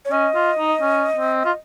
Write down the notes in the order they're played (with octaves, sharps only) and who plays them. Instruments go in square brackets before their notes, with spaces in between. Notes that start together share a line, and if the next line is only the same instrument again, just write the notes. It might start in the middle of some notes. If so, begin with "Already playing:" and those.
[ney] C#5
[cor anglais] C#4 [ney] D#5
[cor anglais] F4
D#4
C#4
C4
F4